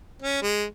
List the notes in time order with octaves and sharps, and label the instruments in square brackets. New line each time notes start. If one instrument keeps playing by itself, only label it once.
[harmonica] C#4
G#3